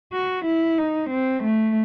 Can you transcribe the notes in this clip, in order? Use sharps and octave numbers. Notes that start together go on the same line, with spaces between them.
F#4
E4
D#4
C4
A3